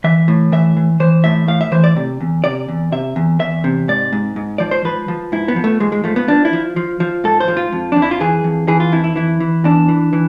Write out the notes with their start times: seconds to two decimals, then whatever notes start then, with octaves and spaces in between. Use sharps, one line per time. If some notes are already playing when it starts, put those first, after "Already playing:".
0.04 E3 E5
0.28 A2
0.52 E3 E5
0.77 E3
1.00 E3 C5
1.24 A2 E5
1.48 A2 F5
1.61 E5
1.72 E3 C5
1.84 D5
1.96 C3
2.21 E2
2.44 C3 D5
2.69 E2
2.92 C3 E5
3.16 E2
3.40 E2 E5
3.64 C3
3.88 G#2 D5
4.13 G#2
4.36 G#2
4.58 F3 D5
4.71 C5
4.85 F3 B4
5.08 F3
5.32 G#2 E4
5.48 B3
5.56 F3
5.64 A3
5.80 G#2 G#3
5.92 G#3
6.04 F3 A3
6.16 B3
6.28 F3 D4
6.45 E4
6.53 F3
6.76 F3
7.00 F3
7.24 G#2 A4
7.40 C5
7.48 F3
7.57 F4
7.72 F2
7.92 D4
7.96 F2
8.02 E4
8.11 F4
8.20 E3 G#4
8.44 F2
8.68 E3 G#4
8.80 F4
8.92 F2 E4
9.04 E4
9.16 E3 E4
9.40 E3
9.64 E2 D4
9.89 E3
10.13 E3